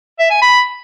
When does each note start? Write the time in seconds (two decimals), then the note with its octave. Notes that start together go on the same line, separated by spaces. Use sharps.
0.19 E5
0.31 G#5
0.42 B5